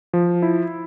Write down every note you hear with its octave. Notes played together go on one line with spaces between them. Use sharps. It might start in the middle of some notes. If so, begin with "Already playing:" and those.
F3
E4